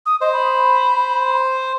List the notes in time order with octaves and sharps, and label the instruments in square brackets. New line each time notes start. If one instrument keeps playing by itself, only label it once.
[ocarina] D#6
[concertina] C5 [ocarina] D#5
[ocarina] B5